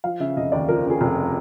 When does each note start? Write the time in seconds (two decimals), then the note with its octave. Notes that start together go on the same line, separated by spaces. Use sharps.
0.04 F3 F5
0.20 C#3 E5
0.37 F1 D#5
0.52 D#2 D5
0.69 F3 A#4
0.85 C#3
0.90 G#4
1.01 F1